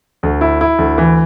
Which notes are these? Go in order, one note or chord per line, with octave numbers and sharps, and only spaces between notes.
D2
E4
E4
D2
E3